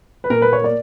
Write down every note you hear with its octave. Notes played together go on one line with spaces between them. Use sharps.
B4
A#2 A#4
A#3 B4
C#5
A#3 D5